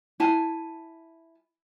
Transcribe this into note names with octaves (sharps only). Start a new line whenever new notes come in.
E4 G#5 A5